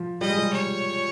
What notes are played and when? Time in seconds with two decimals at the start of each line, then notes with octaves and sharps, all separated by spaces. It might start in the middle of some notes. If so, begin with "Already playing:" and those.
Already playing: F3
0.21 G3 D#5
0.30 G#3
0.38 G3
0.53 C#5